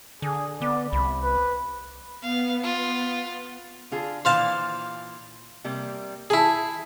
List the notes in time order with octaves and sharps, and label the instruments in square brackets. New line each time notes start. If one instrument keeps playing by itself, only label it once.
[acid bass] D3 [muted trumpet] G#4
[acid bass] B3 [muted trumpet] D5
[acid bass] C2 [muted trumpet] B5
[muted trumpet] B4
[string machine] B3 [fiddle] F5
[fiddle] F4
[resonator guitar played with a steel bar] D3 F4 G#4
[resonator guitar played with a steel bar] A#2 E3 [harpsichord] C5 F5 A5
[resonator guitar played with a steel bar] C3 G3 A#3
[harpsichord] E4 G#4 [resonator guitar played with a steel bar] A5